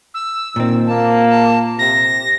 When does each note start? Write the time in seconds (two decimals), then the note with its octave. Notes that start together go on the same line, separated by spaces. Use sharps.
0.14 E6
0.56 A#2 D#3 C4
0.87 A#3 A5
1.28 A5
1.79 C3 A#6